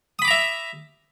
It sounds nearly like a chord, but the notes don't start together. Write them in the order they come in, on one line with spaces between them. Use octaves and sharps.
D#6 B5 D6 A#5 E5